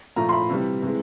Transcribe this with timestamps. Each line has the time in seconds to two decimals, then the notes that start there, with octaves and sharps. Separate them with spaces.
0.16 A#2 F3 A3 A#5
0.29 C6
0.33 B5
0.50 C3 E3 G3
0.82 C3 E3 G#3